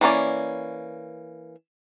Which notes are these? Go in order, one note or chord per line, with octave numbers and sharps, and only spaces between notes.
E3 A#3 C#4 D5